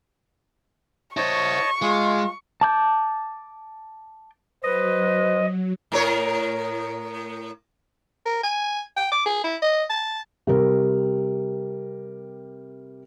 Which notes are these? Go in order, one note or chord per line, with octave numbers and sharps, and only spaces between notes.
E4 C5 C#5 D#5 A5 C#6
G#3 F4 G#4
A5 D6 G6
F#3 B4 C5 D#5
A2 A#4 C#5
A#4
G#5
G5
D6
G#4
E4
D#5
A5
C3 G3 A#4